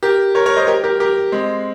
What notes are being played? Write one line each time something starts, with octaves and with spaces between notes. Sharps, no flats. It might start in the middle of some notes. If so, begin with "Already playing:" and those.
G4 A#4
A#4 C#5
A#4 C#5
C5 D#5
G4 A#4
G4 A#4
G4 A#4
G#3 C4